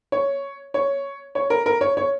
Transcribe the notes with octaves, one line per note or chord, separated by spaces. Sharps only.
C#5
C#5
C#5
A#4
A#4
C#5
C#5